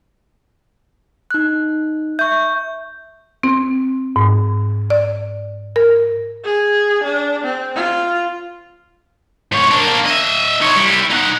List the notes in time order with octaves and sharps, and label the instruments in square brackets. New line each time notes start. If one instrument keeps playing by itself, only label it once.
[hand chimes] D#4 F#6
[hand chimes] E5 C#6 [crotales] G6
[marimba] C4
G#2
D5
A#4
[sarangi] G#4
D4
C4
F4
[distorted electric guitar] G#2 C#5
A#3 D4
D#5 E5
D#4 C#5
G3 E4
D#4 F#5